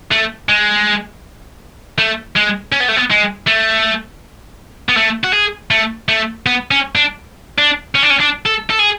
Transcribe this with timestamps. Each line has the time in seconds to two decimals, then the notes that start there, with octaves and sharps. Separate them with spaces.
0.11 A3
0.49 G#3
1.98 A3
2.36 G#3
2.72 C#4
2.80 B3
2.88 A3
2.96 B3
3.10 G#3
3.47 A3
4.89 B3
4.97 A3
5.24 F#4
5.33 G#4
5.71 A3
6.09 A3
6.46 B3
6.71 C#4
6.95 D4
7.58 D4
7.95 C#4
8.02 D4
8.10 C#4
8.20 D4
8.45 A4
8.70 A4
8.79 G#4